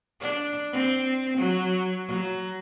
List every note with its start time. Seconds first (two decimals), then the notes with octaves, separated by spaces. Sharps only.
0.20 D4
0.73 C4
1.37 F#3
2.07 F#3